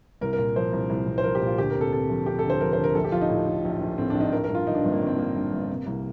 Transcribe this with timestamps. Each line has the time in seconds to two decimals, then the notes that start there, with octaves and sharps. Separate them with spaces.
0.21 C2 A#4
0.33 A#4
0.39 A#2
0.56 F3 C5
0.73 C2
0.90 C2
1.07 C2
1.18 C5
1.24 F3 A#4
1.35 G4
1.42 A#2 F4
1.58 D2 G4
1.70 C3 A#4
1.81 A4
1.93 C3 A4
2.10 F3
2.26 C3 G4
2.39 A4
2.45 D2
2.50 C5
2.61 F3 A#4
2.73 C5
2.79 D2
2.84 A#4
2.95 A#1 A4
3.04 G4
3.12 F3 F4
3.21 D#4
3.30 A2
3.47 A2
3.64 A#1
3.81 A#1
3.98 A2 C4
4.10 A#1 D4
4.21 D#4
4.32 F3 A#4
4.44 A#4
4.49 G2
4.55 F4
4.67 G1 D#4
4.75 D4
4.84 G1 C4
4.92 A#3
5.02 G1
5.07 C4
5.18 G1 A#3
5.35 G2
5.52 G1
5.69 C3
5.86 C2